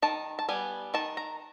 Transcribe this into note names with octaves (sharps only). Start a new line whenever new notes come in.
D#3 A5
A5
G3 B3 G#5
D#3 A5
A#5